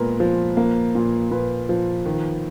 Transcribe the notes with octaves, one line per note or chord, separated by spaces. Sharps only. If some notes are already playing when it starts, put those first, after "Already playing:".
Already playing: A#2 G#3 B3 A#4 B4
F3
A#3
A#2
A#2 B4
F3
D#3